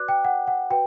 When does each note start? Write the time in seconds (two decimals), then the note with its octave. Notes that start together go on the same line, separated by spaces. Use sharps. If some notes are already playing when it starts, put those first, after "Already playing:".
Already playing: F#4 B4 D5 D6 F#6
0.08 G5
0.25 F#5
0.47 F#5
0.70 F#4 B4 G5